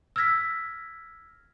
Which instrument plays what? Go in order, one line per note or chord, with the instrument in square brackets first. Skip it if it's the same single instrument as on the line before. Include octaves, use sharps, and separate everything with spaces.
[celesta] E6 F6 G#6 A#6 B6